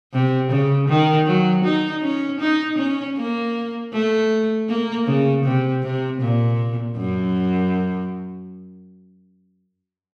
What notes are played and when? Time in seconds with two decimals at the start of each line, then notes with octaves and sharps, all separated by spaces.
0.13 C3
0.51 C#3
0.88 D#3
1.27 F#3
1.64 D#4
2.03 C#4
2.40 D#4
2.78 C#4
3.17 A#3
3.93 A3
4.69 A#3
5.07 C#3
5.44 C3
5.83 C3
6.21 A#2
6.96 F#2